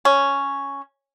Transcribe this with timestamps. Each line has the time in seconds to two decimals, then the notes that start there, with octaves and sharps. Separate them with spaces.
0.05 C#4